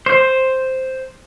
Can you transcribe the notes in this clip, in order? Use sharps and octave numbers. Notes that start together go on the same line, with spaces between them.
C5